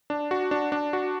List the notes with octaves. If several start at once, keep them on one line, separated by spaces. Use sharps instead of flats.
D4
F#4
D4
D4
F#4